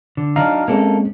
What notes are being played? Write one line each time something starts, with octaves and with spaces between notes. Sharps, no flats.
D3
F#3 D4 D#4 F5 A#5 F6
G#3 A#3 C4 C#4 A4